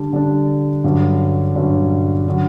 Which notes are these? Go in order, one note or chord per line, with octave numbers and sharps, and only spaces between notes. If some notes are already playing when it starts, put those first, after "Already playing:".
Already playing: D3 G3 D4
D3 G3 D4
G2 D3 F#3 C#4
G2 D3 F#3 C#4
D3 F#3